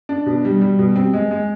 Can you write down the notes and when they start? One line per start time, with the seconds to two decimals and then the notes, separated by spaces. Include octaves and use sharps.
0.09 D4
0.26 B2
0.45 G3
0.61 G3
0.79 B2
0.96 C4
1.13 G#3
1.31 G#3